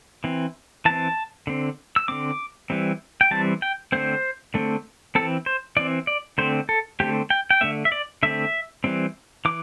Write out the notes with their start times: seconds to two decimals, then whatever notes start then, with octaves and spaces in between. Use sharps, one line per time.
0.24 E3 C4
0.85 E3 C4 A5
1.47 D3 C4
1.96 E6
2.08 D3 C4 D6
2.70 E3 G3 C4
3.21 G5
3.31 E3 G3 C4 A5
3.62 G5
3.92 D3 A3 C4 C5
4.54 D3 A3 C4
5.15 E3 C4 A4
5.46 C5
5.77 E3 C4 D5
6.07 D5
6.38 D3 A3 C4 C5
6.69 A4
7.00 D3 A3 C4 G4
7.30 G5
7.50 G5
7.61 D3 A3 C4 E5
7.85 E5
7.92 D5
8.23 D3 A3 C4 E5
8.84 E3 G3 C4
9.45 E3 D6